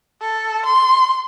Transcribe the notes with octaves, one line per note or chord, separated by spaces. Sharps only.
A4
C6